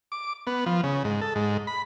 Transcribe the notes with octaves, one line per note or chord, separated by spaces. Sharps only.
D6
B3
F3
C#3
G#2
A4
G#2
B5